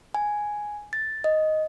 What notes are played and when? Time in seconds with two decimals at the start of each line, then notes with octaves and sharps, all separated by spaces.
0.14 G#5
0.93 A6
1.24 D#5